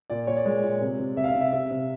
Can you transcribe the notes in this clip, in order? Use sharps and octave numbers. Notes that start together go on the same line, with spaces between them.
A#2 D5
A#2 C#5
D5
G#3
A#2
C3
C3
C3 E5
F5
E5
C3
E5
C3 E5
C3